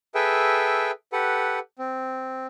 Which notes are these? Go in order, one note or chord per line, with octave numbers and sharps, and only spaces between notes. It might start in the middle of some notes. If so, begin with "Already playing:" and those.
G#4 A4 B4 E5 G5
G4 A4 B4 F#5
C4